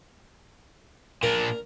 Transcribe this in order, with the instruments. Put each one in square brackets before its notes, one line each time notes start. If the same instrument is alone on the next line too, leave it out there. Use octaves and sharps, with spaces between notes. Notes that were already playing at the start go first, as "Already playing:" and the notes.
[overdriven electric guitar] A#2 D4 [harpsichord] A#4